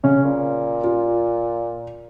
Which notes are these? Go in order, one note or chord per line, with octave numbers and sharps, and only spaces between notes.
C#3 C#4
A#2
F4